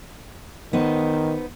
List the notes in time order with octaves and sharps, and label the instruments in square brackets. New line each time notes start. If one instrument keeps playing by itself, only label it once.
[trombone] D#3 [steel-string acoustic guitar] B3 D#4 C5